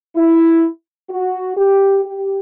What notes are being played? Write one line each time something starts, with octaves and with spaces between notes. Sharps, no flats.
E4
F#4
G4
G4